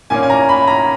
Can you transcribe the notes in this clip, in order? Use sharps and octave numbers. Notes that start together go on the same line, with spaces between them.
A#2 A#3 C#4 G#5
G#5
A#5
B5
A#5